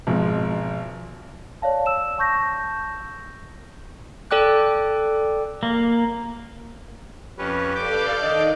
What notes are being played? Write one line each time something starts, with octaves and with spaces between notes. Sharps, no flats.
G#1 B2 F3 G#3
C#5 D5 F5 A5
E6 E7
A5 C#6 G6 A#6
A4 D5 G5 D6 F#6
A#3
F2 C#4 G4 B4
A4 D5 F5 G5 D6 G6
D#3 D4 D#5